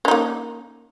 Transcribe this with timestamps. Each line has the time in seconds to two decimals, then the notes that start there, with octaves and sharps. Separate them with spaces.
0.05 C#4
0.08 D#4
0.11 A#3